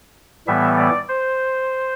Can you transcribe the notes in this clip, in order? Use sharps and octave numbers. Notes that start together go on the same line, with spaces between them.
A2 E3 G3 B3 E5
D5
C5